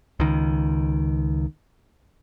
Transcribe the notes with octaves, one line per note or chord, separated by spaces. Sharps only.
C#2 D#3